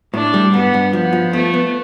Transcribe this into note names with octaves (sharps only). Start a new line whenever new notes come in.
A2 D4
G3
G2 B3
G2
F3 B3
F3
A3 B3
B3